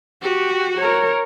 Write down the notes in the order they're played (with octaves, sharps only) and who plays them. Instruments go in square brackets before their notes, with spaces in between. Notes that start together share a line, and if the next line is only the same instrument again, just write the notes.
[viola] F#4 [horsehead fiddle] G4
[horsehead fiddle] A#4 C#5